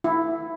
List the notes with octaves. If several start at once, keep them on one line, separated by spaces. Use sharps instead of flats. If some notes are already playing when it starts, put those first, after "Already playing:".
E4